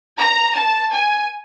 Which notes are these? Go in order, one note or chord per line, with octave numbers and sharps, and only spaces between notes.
A#5
A5
G#5